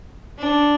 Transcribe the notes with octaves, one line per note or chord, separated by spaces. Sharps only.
D4